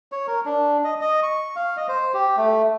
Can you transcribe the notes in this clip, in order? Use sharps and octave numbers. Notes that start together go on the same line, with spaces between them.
C#5
A#4
D4
D#5
D#5
C#6
F5
D#5
C5
G4
A3